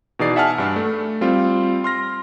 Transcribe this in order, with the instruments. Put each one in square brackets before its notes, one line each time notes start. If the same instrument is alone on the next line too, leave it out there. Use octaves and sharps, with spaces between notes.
[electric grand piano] B2 E3 D#4 G#4 D5 C7
E5 F#5 G#5 A5 F6
G2 D4
A3
G3 C4 F4
C6 F6 A#6